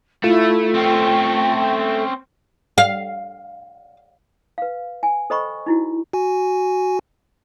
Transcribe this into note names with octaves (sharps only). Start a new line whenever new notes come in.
A3 E4 F4
C4 C#4 G5
F5
B4 F5
G#5
A4 C5 D#5 G5 B5 C#6
D#4 E4 F#4
F#4 G#5